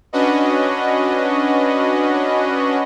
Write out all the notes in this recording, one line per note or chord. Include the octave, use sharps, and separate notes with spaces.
C#4 D4 F#4 B4 D#5